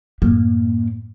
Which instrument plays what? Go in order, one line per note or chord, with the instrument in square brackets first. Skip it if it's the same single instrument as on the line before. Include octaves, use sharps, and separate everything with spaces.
[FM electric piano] F#2 A2 [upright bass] A#3